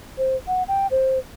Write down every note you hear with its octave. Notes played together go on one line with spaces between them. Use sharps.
C5
F#5
G5
C5